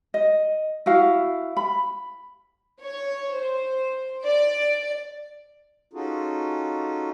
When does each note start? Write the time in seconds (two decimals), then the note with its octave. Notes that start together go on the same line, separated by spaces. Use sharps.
0.14 D#5
0.86 E4 F#4 F5
1.57 B5
2.81 C#5
3.35 C5
4.24 D5
5.93 C#4 D#4 F4 F#4 G#4 A4